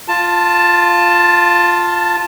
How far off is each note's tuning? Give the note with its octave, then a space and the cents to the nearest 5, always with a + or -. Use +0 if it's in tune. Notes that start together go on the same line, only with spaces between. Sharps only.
F4 +0 A5 +10